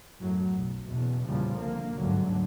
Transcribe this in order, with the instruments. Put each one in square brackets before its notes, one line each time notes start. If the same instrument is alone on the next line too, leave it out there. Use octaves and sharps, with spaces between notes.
[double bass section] F#2 A2 F#3
B1
F#1 E2 B2
E2 A#2 C#3 F3 G3
C2 D3 A#3
G1 D2 G#2 D3 F#3